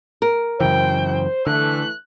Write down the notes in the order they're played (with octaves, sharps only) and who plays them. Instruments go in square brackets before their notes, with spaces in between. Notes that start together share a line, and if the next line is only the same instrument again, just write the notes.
[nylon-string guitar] A#4
[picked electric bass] F#2 C#3 E3 [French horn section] C5 [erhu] G5
[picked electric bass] D3 [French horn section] E3 A3 [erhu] F#6